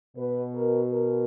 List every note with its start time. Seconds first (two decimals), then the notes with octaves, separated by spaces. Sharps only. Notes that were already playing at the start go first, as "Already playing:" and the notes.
0.17 B2 B4
0.55 A#4
0.92 A#4